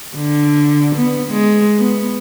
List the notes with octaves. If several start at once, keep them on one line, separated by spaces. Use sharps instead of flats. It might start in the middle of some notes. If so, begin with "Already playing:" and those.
D3
B3
G#3
B3